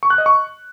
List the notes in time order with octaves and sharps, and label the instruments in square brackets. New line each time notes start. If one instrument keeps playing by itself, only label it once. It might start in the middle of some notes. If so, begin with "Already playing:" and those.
[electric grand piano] C#6
F#6
D#5
C#6